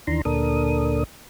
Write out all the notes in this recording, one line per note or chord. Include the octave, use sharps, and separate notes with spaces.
D#2 D#3 E3 D4 A#5 C6
D2 A#2 D4 A4 A#4 D#6